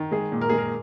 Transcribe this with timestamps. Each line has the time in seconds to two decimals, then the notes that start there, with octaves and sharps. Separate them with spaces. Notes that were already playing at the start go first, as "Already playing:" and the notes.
Already playing: D#3
0.11 G#3 G#4
0.32 A#2
0.41 A#4
0.49 G#3 G#4
0.58 A#4